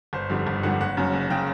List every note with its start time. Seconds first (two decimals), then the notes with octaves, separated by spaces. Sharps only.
0.13 G1 C5
0.30 F2 D3 G3
0.47 G1
0.63 F2 D3 G3 F#5
0.81 F#1 F#5
0.97 F#2 C#3
1.13 F#1
1.30 C#3 G5